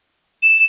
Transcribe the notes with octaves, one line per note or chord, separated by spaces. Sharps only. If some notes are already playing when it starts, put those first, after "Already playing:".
E7